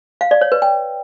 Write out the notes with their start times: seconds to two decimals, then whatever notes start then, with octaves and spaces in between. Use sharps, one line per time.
0.21 F5
0.31 D5
0.41 C#5
0.52 B4
0.62 G5